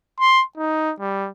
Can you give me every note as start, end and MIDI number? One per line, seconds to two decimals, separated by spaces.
0.20 0.43 84
0.58 0.92 63
1.00 1.28 55